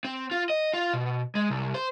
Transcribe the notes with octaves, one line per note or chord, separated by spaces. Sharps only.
C4
F4
D#5
F4
B2
G#3
C2
C5